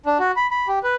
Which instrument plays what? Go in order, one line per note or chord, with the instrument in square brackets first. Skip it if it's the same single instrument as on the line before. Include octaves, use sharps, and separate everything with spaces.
[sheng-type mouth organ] D4
F#4
B5
B5
G4
B4